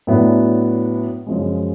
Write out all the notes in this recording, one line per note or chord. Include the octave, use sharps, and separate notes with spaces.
A2 F#3 B3 D4
F#2 C#3 F3 G#3